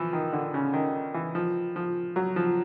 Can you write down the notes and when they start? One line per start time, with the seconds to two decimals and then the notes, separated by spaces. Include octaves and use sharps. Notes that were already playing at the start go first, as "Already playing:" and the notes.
Already playing: E3 F3
0.13 D#3
0.33 D3
0.54 C#3
0.74 D#3
1.14 E3
1.35 F3
1.76 F3
2.16 F#3
2.36 F3